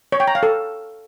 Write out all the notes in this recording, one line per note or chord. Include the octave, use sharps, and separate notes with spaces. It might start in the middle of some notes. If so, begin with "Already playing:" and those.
C#5
G5
A#5
F5
A4